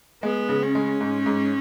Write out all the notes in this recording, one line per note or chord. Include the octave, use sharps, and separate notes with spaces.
G#3 B3
C#3
C#4
G#3
G#2
G#2